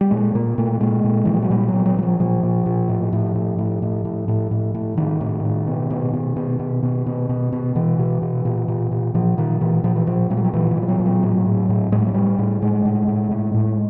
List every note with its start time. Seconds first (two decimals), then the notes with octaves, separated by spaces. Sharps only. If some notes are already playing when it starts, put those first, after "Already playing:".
0.01 G3
0.11 A#2 G#3
0.35 A#2 A#3
0.58 A#2 A3
0.81 A#2 G#3
1.04 A#2
1.25 A#2 E3
1.34 F3
1.42 F#3
1.50 A#2 G3
1.68 F#3
1.73 A#2
1.86 F#3
1.97 A#2 F#3
2.02 F3
2.20 A#2 F3
2.43 A#2
2.66 A#2
2.89 A2
3.13 A2
3.35 A2
3.59 A2
3.82 A2
4.05 A2
4.28 A2
4.51 A2
4.75 A2
4.97 A2 D#3
5.21 A2
5.44 A2
5.67 B2
5.90 B2
6.13 B2
6.36 B2
6.59 B2
6.83 B2
7.06 B2
7.29 B2
7.52 B2
7.75 B2 E3
7.99 B2
8.22 B2
8.45 A#2
8.68 A#2
8.91 A#2
9.14 A#2 F3
9.38 A#2 D#3
9.61 A#2 E3
9.84 A#2 F3
9.96 E3
10.07 A#2 F3
10.30 A#2 F#3
10.37 G3
10.44 F#3
10.53 A#2 E3
10.71 E3
10.77 A#2
10.82 F3
10.88 F#3
11.00 A#2
11.06 F#3
11.23 A2
11.46 A2
11.69 A2
11.92 A2 G#3
12.00 G3
12.07 F#3
12.14 A2 G3
12.39 A2
12.62 A2 G#3
12.85 A2
13.08 A2
13.31 A2
13.54 A2